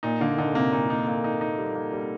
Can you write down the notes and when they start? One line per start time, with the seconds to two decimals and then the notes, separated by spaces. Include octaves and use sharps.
0.03 A#2 D#4
0.21 D3 A#3
0.38 D3 D#4
0.55 C3 A#3
0.72 A#2 D#4
0.90 D#4
1.07 A#3
1.24 D#4
1.41 D#4
1.58 G3
1.75 A#3
1.93 G3